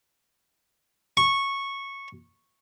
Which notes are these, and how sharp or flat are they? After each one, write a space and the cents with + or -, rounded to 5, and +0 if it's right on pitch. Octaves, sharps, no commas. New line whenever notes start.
C#6 -10